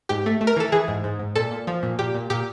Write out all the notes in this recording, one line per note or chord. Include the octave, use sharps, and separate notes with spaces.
G#2 G4
A3
A3
A#4
E3 A4
E3 G#4
G#2
G#2
G#2
A#2 A4
A#2
F3
A#2
A#2 G4
A#2
A#2 G4